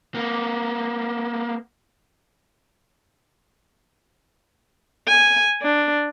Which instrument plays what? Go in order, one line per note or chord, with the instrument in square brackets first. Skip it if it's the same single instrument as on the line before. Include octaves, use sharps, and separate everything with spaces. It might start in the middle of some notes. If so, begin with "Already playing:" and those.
[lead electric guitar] A#3 B3
[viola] G#5
D4